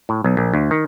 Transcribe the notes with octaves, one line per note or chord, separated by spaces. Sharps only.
A2
B1
A#1
D2
D#3